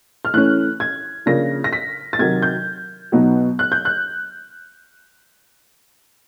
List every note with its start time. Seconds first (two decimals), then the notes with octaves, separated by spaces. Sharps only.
0.25 F6
0.33 E3 A3 C#4 F#6
0.80 G#6
1.26 C#3 F3 A#3 D4 A#6
1.64 A#6
1.73 B6
2.13 A6
2.19 C3 D#3 F#3 G#6
2.42 G6
3.12 B2 F#3 B3 D#4
3.59 F#6
3.72 G6
3.85 F#6